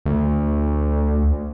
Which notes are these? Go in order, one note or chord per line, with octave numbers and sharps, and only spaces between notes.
D2